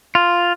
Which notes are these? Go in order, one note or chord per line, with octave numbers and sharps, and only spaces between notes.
F4